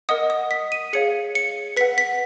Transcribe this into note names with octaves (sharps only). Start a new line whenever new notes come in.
A#4 D#5 F#5 D#6
D#6
B6
D#7
G#4 C#5 F5 C#7
C#7
B4 F#5 B6
B6